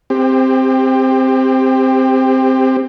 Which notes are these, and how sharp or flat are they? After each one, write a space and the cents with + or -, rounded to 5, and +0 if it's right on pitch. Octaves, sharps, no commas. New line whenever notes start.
C4 +0 G4 +25